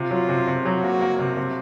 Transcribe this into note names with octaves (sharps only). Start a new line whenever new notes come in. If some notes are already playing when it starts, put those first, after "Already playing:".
Already playing: C3 F4
F#3
C3
C3
F#3 F#4
A#3
A#3
C3
C3